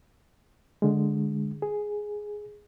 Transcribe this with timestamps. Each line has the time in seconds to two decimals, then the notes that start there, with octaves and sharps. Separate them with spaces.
0.82 D3 G#3
1.62 G#4